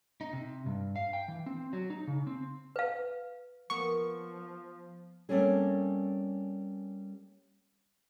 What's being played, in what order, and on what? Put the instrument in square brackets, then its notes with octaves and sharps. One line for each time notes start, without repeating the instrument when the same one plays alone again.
[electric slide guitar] D#4
C3
G2
F5
G5
E3
C4
F#3
D#4
C#3
C4
[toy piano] B4 F5
[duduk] F3 [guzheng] A#3 B3 [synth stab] C#6
[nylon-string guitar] G3 A3 A#3 C4 C#4 G#4